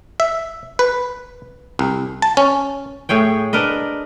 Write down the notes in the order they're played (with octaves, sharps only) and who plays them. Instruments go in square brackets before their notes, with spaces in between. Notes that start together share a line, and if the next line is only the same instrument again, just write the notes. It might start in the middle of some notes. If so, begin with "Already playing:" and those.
[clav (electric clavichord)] E5
B4
C2
A5
C#4
[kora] A2 G#4 C#5 G5
D4 A#4 B4 D#5